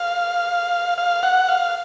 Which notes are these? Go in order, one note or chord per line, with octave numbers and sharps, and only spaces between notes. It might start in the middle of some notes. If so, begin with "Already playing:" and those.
Already playing: F5
F5
F#5
F5